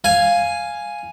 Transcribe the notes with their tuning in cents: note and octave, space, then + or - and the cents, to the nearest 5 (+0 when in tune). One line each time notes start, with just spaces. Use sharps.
F5 +0 G#5 +0